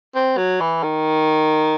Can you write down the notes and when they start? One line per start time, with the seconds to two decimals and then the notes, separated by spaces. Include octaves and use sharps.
0.15 C4
0.37 F#3
0.61 E3
0.83 D#3